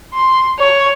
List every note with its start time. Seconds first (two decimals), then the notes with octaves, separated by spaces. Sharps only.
0.14 C6
0.59 C#5